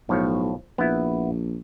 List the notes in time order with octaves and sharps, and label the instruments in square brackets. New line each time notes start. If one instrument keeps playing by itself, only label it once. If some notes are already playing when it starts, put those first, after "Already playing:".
[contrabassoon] B1 [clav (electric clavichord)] A2 F3 C#5
[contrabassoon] A#1 [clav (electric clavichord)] B3 E4